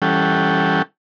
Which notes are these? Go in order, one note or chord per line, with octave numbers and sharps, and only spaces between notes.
E3 G3 C#4 A4 F#5 G5